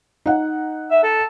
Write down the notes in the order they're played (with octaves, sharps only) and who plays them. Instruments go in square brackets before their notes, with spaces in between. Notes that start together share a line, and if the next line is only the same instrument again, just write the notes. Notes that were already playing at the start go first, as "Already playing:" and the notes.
[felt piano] D#4 F#5
[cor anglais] E5
A4